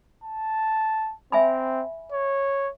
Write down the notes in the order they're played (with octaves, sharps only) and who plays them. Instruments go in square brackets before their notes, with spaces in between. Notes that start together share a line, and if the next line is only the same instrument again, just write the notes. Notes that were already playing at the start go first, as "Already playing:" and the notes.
[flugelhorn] A5
[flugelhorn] C4 [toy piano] E5 G#5 B5
[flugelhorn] C#5